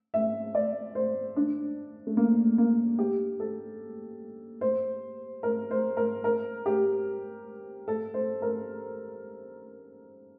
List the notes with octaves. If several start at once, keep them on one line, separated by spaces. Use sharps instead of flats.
E5
D5
C5
D4
A3
A#3
A#3
G4
A4
C5
A#4
C5
A#4
A#4
G4
A4
C5
A#4